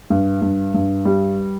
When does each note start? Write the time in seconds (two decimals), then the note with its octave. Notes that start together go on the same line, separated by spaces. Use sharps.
0.10 G2
0.42 G2
0.74 G2
1.05 G3